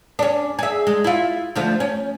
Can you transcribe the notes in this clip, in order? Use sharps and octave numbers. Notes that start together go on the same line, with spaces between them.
C#4 D4
G#4 E5
G#3
E4 F4
D2 F3 A3
C#4